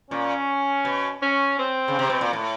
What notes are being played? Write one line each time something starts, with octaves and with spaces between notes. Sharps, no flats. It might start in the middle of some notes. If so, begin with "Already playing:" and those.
A#2 C#4
B2
C#4
C4
C#3
C3
B2
A#2
A2